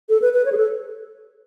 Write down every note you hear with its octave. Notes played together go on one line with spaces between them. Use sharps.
A4
B4
B4
C#5
G#4
A4